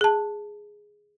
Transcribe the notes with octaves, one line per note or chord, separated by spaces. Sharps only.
G#4 A5